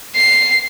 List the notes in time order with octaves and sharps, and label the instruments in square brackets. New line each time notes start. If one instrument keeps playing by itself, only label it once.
[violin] C7